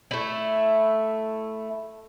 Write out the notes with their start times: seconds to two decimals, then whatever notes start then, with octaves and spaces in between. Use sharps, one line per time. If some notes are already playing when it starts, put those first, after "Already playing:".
0.11 A3 E4